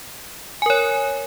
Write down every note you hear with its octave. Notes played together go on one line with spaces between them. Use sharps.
A#4 C#5 G#5